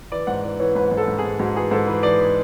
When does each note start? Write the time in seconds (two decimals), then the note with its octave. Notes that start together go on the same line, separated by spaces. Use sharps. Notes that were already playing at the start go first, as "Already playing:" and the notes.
0.12 E3 D5
0.27 G#2 F#5
0.43 E3 D5
0.60 E3 C#5
0.75 G#2 B4
0.91 G#2
0.97 A4
1.08 G#2
1.19 G#2 G#4
1.39 G#2 F#4
1.55 E3 G#4
1.71 G#2 A4
1.87 E3 B4
2.03 E3 D5